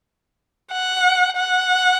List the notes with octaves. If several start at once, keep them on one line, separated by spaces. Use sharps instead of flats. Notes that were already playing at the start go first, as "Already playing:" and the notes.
F#5
F#5